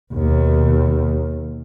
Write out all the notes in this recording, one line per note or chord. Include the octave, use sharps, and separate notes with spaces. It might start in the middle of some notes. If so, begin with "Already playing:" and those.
D#2 B2